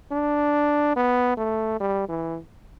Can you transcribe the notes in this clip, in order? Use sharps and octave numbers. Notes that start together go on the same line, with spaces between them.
D4
B3
A3
G3
E3